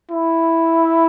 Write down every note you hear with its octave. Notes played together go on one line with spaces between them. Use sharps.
E4